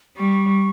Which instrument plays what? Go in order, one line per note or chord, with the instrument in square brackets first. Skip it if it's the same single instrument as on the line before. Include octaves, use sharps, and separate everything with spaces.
[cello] G3 [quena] C#6